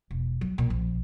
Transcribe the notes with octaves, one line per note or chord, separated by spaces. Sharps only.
E1
F#3
A#2
A#1